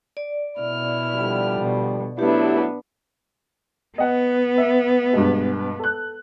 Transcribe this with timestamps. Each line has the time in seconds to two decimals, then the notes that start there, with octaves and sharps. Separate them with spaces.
0.17 D5
0.61 B2 E4 F6
1.13 D3 F3 G3
1.60 B2
2.19 F#3 A3 B3 D4 E4 G4 B4
3.98 B3 D#5 F#5
4.58 E5
5.13 G2 B2 G#3
5.79 A4 F#6